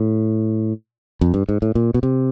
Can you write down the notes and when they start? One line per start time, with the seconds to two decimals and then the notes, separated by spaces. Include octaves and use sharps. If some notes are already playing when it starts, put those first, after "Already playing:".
Already playing: A2
1.21 F2
1.34 G2
1.49 G#2
1.62 A2
1.75 A#2
1.94 B2
2.03 C3